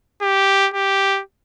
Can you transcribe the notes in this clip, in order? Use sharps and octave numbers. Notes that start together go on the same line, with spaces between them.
G4
G4